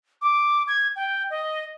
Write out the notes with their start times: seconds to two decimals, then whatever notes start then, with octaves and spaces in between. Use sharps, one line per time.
0.22 D6
0.68 G#6
0.96 G5
1.30 D#5